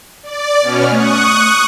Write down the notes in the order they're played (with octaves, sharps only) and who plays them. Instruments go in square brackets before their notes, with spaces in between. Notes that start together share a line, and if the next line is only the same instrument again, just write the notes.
[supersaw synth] D5
B2 C#4 F6
[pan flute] A3 [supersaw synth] C#6 D#6 F#6